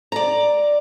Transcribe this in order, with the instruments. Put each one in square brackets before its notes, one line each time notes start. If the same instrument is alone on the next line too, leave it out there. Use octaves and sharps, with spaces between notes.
[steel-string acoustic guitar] D5 A#5